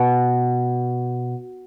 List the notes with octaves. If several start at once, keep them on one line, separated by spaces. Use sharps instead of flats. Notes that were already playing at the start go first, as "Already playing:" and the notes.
Already playing: B2